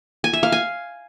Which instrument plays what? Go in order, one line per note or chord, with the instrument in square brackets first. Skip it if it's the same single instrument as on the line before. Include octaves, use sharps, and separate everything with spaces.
[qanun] G#5
E5
F5
G#5